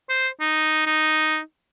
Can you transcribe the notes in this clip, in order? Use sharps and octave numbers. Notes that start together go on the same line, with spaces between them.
C5
D#4
D#4